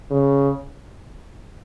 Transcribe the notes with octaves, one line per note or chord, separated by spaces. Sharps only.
C#3